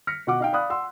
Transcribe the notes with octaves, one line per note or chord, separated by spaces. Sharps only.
F6 A#6 B6 C#7
B2 F#4 F#5 D6
D#4 F5 G5
D5 F5 B5 D#6 F#6
F#5 C6 E6